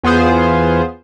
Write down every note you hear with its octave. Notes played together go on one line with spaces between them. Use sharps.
E2 B3 F4 G#4 C5